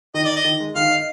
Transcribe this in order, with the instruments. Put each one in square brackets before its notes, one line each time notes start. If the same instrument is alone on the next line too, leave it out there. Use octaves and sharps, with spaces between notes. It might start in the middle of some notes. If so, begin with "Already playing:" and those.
[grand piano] D#3 [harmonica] D#5
[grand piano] D#4 [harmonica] D5
[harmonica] D#5
[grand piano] D#3
G#3
[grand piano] D#3 [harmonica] F5
[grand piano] D#4